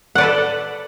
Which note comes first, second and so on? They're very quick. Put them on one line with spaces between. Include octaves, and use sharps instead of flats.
F#5 D5 B4 A4